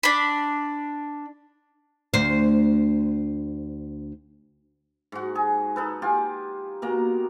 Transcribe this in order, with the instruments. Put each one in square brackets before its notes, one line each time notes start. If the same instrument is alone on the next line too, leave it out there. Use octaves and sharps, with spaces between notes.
[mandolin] D4 B5
[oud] D2 C5
[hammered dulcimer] G#2 F#4
G#4
D#4 A4 B4
F4 G4 G#5
B2 A#3 A#5